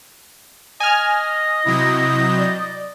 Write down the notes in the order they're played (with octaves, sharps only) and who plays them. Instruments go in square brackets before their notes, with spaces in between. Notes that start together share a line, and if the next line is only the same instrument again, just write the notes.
[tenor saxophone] D#5 [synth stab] G#5 F6
[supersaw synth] C3 F#3 G6 [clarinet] E4
[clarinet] D5